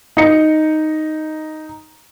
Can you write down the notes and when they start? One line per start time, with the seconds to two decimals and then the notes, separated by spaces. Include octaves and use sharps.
0.17 D#4 C#7